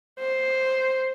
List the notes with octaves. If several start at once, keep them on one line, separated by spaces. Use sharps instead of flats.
C5